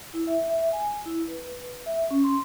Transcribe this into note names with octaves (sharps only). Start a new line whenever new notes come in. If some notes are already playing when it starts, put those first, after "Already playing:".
E4
E5
E5
G#5
E4
B4
E5
C#4
C6